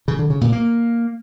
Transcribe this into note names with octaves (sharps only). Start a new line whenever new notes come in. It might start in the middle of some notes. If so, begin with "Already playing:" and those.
C#3
D3
C#3
A#2
A#3